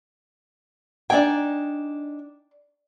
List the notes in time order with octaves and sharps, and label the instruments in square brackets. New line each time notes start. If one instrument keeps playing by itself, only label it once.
[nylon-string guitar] D4 D#4 G#5 [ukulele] D5 G5